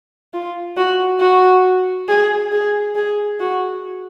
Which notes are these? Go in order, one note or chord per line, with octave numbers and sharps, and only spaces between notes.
F4
F#4
F#4
G#4
G#4
G#4
F#4